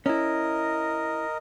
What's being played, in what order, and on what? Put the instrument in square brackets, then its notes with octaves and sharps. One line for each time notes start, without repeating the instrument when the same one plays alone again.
[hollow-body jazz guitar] C#4 E4 [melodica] A#4 D#5